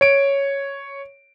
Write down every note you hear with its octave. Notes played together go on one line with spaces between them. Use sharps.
C#5 D7